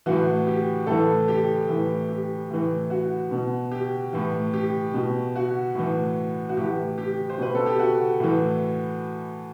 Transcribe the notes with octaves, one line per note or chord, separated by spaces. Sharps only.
A2 E3 F#4
G4
A2 E3 A4
G4
A2 E3
G4
A2 E3
F#4
B2
G4
A2 E3
G4
B2
F#4
A2 E3
F#4
A2 E3 G4
G4
C5
B2 B4
A4
G4
F#4
A2 E3